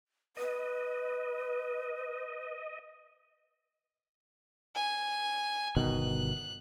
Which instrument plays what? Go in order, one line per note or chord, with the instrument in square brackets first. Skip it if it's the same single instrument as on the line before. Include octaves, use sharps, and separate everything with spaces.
[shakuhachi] B4 [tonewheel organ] D#5
[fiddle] G#5
[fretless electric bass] G1 B2 D#3 [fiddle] F#6